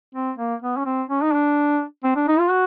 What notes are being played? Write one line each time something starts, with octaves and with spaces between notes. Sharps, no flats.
C4
A#3
B3
C#4
C4
C#4
D#4
D4
C4
D4
D#4
F4
F#4